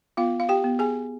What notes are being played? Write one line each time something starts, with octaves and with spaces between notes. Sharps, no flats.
B3 F4 F5
F5
G4 G5
B3
G#4 G#5